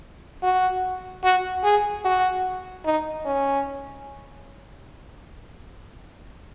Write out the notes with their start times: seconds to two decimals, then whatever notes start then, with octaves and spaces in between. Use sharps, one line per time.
0.43 F#4
1.24 F#4
1.64 G#4
2.05 F#4
2.85 D#4
3.25 C#4